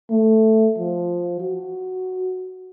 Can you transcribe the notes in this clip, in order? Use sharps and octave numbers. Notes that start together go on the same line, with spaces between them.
A3
F3
F#4